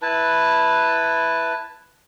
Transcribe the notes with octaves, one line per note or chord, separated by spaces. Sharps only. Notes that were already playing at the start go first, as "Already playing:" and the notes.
E4 B4 A5